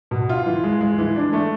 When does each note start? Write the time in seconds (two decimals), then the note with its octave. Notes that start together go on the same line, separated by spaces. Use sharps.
0.11 B2
0.29 F4
0.46 E3
0.64 G#3
0.81 G#3
0.98 E3
1.16 D4
1.33 A3